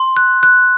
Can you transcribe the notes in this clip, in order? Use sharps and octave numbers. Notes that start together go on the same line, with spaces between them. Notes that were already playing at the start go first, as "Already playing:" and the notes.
Already playing: C6
F#6
F#6